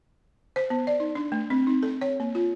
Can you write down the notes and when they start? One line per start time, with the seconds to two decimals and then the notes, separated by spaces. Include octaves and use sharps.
0.56 C5
0.70 B3
0.87 D5
1.00 D#4
1.15 D4
1.32 A3
1.50 C4
1.67 D#4
1.83 A4
2.01 C#5
2.20 A#3
2.35 F4